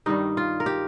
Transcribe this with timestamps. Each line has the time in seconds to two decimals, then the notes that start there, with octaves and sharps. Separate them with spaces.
0.06 G2 D#3 G3 D#4
0.37 F4
0.60 A#4
0.66 G4